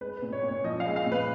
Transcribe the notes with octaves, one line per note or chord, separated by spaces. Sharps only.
G#3 B4
B4
A#2
C#5
A#2
C#5
F3 D#5
F5
G#3
F5
A#2
B4